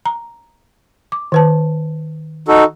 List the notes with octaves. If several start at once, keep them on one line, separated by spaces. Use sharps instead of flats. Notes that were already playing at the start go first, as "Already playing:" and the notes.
A#5
D6
D#3 B4 A5
D#4 F#4 A4